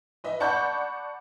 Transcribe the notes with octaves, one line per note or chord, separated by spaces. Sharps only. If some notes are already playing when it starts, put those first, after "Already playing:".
B4 D#5 E5
D5 F#5 A5 B5 C#6 G6